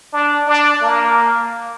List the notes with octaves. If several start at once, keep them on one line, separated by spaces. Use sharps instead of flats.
D4
D4
A#3